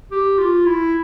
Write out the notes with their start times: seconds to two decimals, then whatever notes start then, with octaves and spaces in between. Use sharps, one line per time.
0.11 G4
0.38 F4
0.66 E4